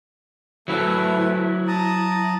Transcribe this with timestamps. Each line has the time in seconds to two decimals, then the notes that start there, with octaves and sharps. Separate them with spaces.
0.68 F#3 A3 E4 B4 E5
1.67 A5 A#5 D#6